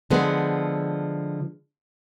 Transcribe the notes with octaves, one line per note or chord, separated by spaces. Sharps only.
D3 F3 G#3 B3